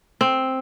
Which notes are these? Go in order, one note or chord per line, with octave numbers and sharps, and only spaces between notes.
C4